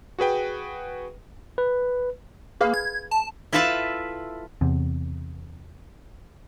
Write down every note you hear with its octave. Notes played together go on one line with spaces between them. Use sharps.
F#4 G#4 B4 G5
B4
A#3 G#4 B4 F5
G#6
A5
E4 F4 A4 B4 E5 A5
E2 C3